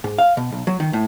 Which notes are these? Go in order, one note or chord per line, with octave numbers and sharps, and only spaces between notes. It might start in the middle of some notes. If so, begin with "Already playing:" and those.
G#2
F5
B2
B1
F#3
D#3
A2